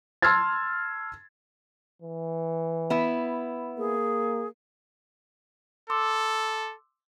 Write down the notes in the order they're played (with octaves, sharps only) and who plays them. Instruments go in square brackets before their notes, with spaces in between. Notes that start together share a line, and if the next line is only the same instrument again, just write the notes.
[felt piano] A5 C6 E6 F6 G#6 A6
[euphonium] E3
[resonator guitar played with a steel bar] B3 E4
[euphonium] A#3 [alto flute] G#4
[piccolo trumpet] A4 [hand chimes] C6 D6 E6